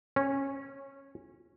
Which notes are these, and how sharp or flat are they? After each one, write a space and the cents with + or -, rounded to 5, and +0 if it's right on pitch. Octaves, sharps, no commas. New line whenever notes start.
C#4 -15